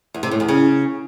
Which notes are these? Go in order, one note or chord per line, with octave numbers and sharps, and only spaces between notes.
E2
C3
A2
E2
C#3